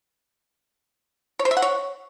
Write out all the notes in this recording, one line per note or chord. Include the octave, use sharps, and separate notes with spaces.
C#5
C5
E5
F#5
C#5